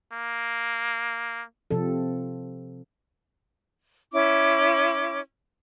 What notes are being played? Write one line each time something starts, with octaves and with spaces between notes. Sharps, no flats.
A#3
C3 F3 C4 A4
C#4 E4 D6